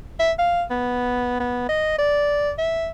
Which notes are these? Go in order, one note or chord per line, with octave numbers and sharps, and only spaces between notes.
E5
F5
B3
B3
D#5
D5
E5